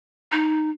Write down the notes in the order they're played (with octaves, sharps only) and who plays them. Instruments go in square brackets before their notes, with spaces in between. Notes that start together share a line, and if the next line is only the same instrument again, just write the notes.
[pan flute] D#4